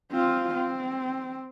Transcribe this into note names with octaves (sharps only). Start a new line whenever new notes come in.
C4 F4
C4